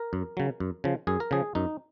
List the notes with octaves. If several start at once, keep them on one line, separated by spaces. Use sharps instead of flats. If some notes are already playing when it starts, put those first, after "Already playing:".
Already playing: A#4
F#2
C#3 F#3
F#2
C#3 F3
F#2 G#4
A#4
C#3 F3 G#4
F#2 D#4